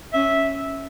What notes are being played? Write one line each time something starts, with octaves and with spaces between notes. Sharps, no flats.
C#4 E5